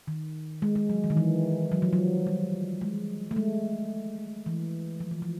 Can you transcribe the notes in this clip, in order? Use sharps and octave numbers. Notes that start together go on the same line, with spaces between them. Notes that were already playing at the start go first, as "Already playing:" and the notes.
D#3
G#3
G#3
F#3
E3
D#3
E3
F#3
F3
F#3
G3
G#3
A3
G#3
E3
F3
E3
F3